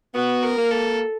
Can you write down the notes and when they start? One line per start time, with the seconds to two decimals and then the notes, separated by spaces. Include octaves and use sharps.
0.15 B3 F#4
0.43 A#4
0.57 A#3
0.70 A4